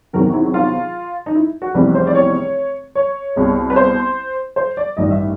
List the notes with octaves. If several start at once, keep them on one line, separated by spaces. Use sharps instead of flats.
E2 C3 D#3 F#3 A#4
E4
F4
D#4
E4
F#4
F1 E2 C3 E3 G3 B4
C5
D5
C#5
C#5
C2 B2 G#3
B4
C5
C5
D5
A1 G2 D#3 G3 D#5
E5